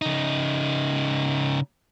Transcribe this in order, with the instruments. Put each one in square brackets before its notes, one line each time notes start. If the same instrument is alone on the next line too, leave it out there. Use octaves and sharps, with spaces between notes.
[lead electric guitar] C#3 D#4